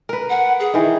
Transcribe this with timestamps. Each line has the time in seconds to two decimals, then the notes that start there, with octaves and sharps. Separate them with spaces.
0.09 A#4 B4
0.30 F#5
0.60 G#4
0.74 D#3 E3